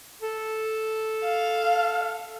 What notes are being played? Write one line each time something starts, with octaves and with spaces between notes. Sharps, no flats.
A4
F5